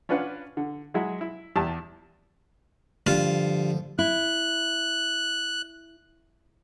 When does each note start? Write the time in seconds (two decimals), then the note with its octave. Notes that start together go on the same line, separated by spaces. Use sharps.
0.09 C#4 D4 F4 B4 F5 F#5
0.57 D3
0.94 F#3 G#3 E4 G#4
1.21 E4
1.56 E2 E4 G4 A5
3.07 G2 D3 F3 F4 F5
3.99 E4 F#6